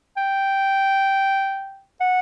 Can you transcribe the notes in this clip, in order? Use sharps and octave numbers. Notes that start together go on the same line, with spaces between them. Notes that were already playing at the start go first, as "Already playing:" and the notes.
G5
F#5